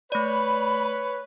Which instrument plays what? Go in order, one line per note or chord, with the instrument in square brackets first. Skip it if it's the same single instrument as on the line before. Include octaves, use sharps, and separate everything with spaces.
[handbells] A3 D5 [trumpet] B4 [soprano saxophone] C#5 [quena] B5